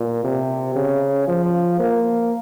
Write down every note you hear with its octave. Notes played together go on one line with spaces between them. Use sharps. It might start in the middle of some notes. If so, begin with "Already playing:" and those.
Already playing: A#2
C3
C#3
F3
A#3